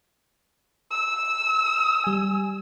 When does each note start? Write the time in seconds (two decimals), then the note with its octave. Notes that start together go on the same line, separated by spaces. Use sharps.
0.91 E6
2.04 G3 G#5